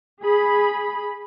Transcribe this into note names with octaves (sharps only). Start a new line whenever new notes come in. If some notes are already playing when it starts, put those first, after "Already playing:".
G#4 B5